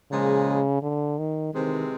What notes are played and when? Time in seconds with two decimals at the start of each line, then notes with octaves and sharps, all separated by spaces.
0.11 A#2 C#3 F3 G#3
0.82 D3
1.18 D#3
1.54 C3 D#3 E3 G#3 C4